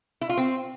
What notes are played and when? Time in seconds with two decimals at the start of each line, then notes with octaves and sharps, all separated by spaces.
0.21 E4
0.29 F4
0.37 C4